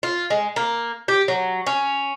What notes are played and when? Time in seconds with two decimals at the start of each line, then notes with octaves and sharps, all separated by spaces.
0.03 F4
0.30 G#3
0.56 A#3
1.08 G4
1.28 F#3
1.67 C#4